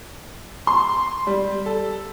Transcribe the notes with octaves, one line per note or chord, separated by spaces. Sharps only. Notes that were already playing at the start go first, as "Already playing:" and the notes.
C6
G3
A4